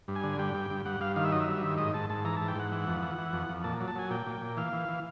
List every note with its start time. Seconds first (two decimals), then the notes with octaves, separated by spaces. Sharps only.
0.08 G2
0.16 G#5
0.24 D3
0.39 G2 G5
0.55 G2
0.70 G2
0.85 G2 F#5
1.01 G2 F5
1.16 D#3 F5
1.24 E5
1.32 F#3 D#5
1.40 E5
1.48 G2
1.63 D#3
1.78 G#2 D#5
1.94 G#2 A5
2.10 G#2 A5
2.24 E3 A#5
2.37 G#2 A5
2.48 G5
2.56 G#2 F#5
2.72 E3
2.87 F2
3.02 E3
3.18 E3
3.33 F2
3.49 F2
3.64 A#2 A5
3.80 F#3
3.88 A5
3.95 F#3 G#5
4.10 A#2 G5
4.26 A#2
4.41 A#2
4.57 E3 F5
4.73 E3
4.89 E3